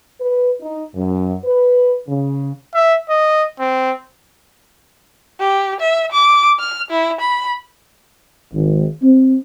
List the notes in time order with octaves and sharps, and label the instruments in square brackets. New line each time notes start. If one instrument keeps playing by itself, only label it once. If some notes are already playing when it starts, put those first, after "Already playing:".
[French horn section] B4
D#4
F#2
B4
C#3
[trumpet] E5
D#5
C4
[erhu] G4
E5
D6
F6
E4
B5
[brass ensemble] G#1
C4